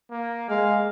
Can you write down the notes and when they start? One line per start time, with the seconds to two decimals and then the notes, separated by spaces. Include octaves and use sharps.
0.11 A#3
0.49 G#3 F5